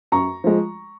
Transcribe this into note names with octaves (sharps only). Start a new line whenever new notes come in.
F#2 A#5 C#6
F3 G#3